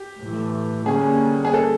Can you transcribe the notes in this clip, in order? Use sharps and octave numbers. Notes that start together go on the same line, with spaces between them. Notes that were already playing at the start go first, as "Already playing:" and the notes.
Already playing: G4
A2 E3 A3
D3 G3 A#3 C#4 G#4
G#4
A4